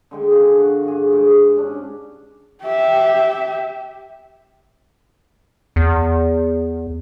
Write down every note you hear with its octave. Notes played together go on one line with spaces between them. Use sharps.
D3 G#3 G5
D4 F4 G#4
F#4
G2 G#4
G#2
C#4 D4
G4 E5
E2